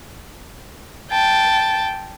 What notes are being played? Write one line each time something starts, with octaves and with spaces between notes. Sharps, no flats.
G5 A5